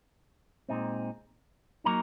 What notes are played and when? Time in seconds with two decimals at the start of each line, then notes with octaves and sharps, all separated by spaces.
0.69 A#2 G#3 C4 D#4
1.84 F#3 A#3 D#4 A#5